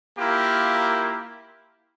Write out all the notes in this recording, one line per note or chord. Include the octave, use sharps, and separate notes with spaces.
A#3 E4 F4 G4 A#4